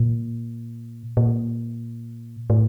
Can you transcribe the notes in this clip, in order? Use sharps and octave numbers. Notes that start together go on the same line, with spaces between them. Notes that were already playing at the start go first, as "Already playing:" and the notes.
Already playing: A#2
A#2
A2